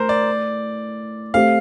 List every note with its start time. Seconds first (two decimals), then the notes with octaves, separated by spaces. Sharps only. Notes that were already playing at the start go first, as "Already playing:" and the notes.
Already playing: A2 A#4 C5
0.09 D5
1.34 A3 C4 G4 F5